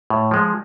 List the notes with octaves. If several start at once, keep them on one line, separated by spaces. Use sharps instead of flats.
A2
F3 G#3